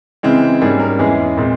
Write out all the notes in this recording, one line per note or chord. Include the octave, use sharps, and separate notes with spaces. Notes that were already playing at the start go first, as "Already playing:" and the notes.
C#3 E3 G#3 C4
G#2 G3 A#3 C#4 G#4
A#4
E2 E3 G#3 C#4 G#4
A#2 G#3 C4